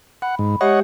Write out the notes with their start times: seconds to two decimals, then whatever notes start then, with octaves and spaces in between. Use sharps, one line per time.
0.22 F#5 B5
0.39 G#2
0.61 G#3 G4 C#5 D#5 E5 F#5